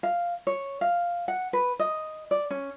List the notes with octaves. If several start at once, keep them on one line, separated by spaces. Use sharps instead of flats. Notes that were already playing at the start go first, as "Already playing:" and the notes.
F5
C#5
F5
F#5
B4
D#5
D5
C#4